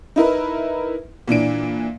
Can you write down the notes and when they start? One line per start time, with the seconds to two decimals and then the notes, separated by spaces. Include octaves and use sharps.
0.16 D#4 E4 A#4 B4
1.28 A#2 E3 D4 D7